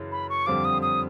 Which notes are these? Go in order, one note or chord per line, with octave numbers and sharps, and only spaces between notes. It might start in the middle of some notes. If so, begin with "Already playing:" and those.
Already playing: F#2 C#3 E3
B5
C#6
F2 D3 G3 C4 F4 D6
D#6
D#6